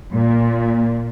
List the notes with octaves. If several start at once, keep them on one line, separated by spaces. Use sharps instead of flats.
A#2